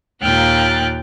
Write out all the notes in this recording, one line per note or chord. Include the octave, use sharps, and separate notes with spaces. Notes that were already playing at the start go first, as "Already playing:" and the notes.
D#2 A#2 G5 F6 F#6 A6